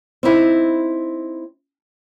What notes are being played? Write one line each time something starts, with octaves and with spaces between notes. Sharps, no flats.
C4 D#4 E4